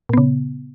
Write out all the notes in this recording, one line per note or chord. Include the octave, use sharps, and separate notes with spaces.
A#2 C#3 B3